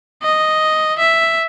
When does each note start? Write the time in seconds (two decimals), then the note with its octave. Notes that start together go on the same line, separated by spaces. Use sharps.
0.23 D#5
0.99 E5